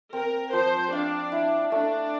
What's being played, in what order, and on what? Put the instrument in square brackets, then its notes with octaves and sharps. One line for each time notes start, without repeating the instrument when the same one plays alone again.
[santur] C4 [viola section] A#4
[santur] F3 [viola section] C5
[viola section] D4 [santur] F5
[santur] E4
[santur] A3 [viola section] D4